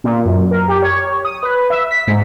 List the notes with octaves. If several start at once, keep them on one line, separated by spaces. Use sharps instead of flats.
A#2
F#2
A#4
G4
C#5
D#6
B4
E5
B6
G#2